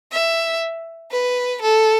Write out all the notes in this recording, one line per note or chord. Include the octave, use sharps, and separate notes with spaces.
E5
B4
A4